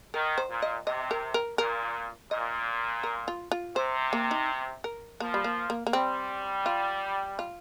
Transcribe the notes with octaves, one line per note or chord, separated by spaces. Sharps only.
D#3 A#4
C5
A#2
D#5
C3 D#5
A#4
A#4
A#2 A#4
A#2 D#5
A#4
F4
F4
C3 C5
A#3
D#4
A#4
F3 A#3
G3
A#3
A#3
A#3
G3 C4
F4
F4